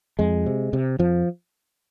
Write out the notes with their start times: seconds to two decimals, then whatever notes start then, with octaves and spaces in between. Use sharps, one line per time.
0.19 F2 G#3
0.46 C3
0.73 C3
0.99 F2 F3